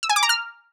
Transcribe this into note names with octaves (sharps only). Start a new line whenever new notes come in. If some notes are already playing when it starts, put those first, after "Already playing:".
E6
G#5
D6
A#5
F6